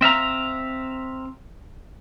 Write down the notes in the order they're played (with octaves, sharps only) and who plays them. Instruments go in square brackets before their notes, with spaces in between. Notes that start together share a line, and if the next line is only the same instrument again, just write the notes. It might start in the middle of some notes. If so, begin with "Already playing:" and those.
[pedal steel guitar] C4 E5 F5 A#5